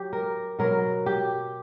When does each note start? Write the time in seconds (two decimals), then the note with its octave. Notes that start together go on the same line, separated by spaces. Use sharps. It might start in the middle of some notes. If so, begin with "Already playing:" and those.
Already playing: F#3 G4
0.13 A#4
0.59 B2 F#3 A#4
1.06 G4